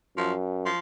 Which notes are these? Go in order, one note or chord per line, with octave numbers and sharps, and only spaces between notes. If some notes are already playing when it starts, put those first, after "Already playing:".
F#2 F3
F3